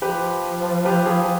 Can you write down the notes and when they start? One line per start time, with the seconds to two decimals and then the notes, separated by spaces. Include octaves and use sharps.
0.02 F3 G4 B4
0.85 G4 B4
1.06 F4 G#4